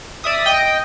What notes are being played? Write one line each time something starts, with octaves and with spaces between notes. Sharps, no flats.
D5 E5 D#6
D#5 G5